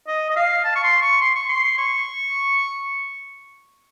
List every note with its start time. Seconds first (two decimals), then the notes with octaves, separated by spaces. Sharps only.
0.08 D#5
0.30 D#5
0.36 F5
0.65 A5
0.76 C#6
0.84 C6
1.02 C#6
1.21 C6
1.35 C#6
1.49 C6
1.78 C#6